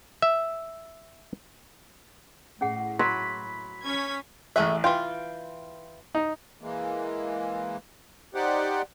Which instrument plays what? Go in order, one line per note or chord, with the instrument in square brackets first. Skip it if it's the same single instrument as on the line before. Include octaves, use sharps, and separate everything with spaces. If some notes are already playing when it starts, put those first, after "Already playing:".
[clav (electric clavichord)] E5
[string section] A2 [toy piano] C#4 G#4 F#5
[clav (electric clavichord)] F#3 [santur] B5 [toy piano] C6
[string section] C#4 G#6 B6
[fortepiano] A1 F#6 [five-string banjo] A3 G#4 E5
[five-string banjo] E3 F4 [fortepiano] G5 C6
[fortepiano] D#4
[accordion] E3 G#3 A#3
D#4 G4 C5 D5 F#5